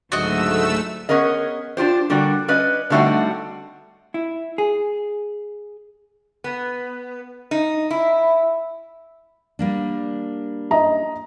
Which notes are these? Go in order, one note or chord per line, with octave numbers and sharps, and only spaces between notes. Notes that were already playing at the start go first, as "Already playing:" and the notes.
C#2 G#2 D3 F#3 A3 F#4 D#5 E6
B3 C#4 G#4 A#4 D#5
D4 F4 G4 C5
D3 G3 A#3 F#4 D5
C#4 B4 D5 D#5
D3 G3 A3 C4 D#4 F#4
E4
G#4
B3
D#4
E4
G3 A#3 D4
D#5 A#5